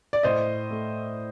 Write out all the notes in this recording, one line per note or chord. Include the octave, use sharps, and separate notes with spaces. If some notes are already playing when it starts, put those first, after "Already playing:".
D5
A2 C5 D#5
A3